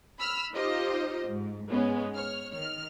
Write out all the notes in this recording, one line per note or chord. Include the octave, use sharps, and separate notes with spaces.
B5 E6 F6
D#4 F4 G4 C5 D#5
G#2
G#2 G#3 B3 C#4
C#5 F6
D#3 F6